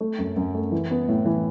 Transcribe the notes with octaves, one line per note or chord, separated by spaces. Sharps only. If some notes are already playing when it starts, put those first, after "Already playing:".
A3
F#2
F#2
A3
E3
B3
A2
E3